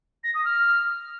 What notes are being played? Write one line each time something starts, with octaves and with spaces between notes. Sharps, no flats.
A#6
D#6
F6